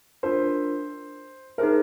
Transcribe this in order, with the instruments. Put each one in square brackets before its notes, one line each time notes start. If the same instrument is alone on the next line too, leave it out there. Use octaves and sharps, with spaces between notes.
[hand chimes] D4 F4 A#4 [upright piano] C5
[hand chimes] D#4 G#4 C5 E5 [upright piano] A#4